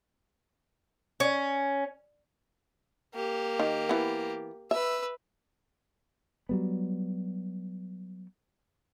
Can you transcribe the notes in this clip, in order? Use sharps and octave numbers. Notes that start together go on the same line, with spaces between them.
C#4
A#3 G4
D#3
E3 B3
B4 E5 E6
F#3 G3 B3